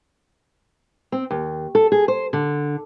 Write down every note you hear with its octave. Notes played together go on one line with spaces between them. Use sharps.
C4
D#2
A4
G#4
C5
D3